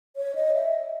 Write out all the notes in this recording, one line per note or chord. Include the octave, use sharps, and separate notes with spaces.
C#5
D#5
E5